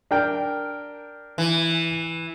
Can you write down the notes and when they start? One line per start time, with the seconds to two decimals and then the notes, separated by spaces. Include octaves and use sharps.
0.11 D4 A#4 G5
1.38 E3